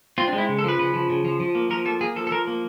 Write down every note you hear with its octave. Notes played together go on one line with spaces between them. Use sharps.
C4 F4
D4
G#3
E4
C#3
A4
F3 B4
C#3 B4
F3
C#3
F3
F3
A#3
F3 A#4
A#3 A4
A#3 G#4
F3 A4
A4
F3 A#4
A#3